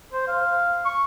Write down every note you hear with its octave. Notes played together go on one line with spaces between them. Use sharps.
C5
F5
C#6